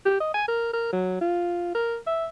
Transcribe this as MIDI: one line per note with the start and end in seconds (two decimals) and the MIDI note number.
0.06 0.20 67
0.20 0.32 75
0.34 0.48 80
0.48 0.73 70
0.73 0.92 70
0.93 1.20 54
1.21 1.73 65
1.75 1.96 70
2.07 2.27 76